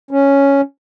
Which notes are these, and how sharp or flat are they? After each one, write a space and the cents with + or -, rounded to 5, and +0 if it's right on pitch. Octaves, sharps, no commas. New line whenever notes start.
C#4 +0